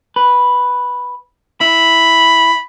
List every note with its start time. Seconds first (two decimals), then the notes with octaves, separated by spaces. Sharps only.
0.16 B4
1.61 E4 B5